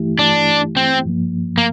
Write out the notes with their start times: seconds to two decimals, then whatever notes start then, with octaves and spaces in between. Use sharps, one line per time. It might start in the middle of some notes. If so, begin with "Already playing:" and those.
Already playing: G2 E3 A3 E4 G4
0.19 D4
0.77 C4
1.06 G2 F3 A#3
1.58 A#3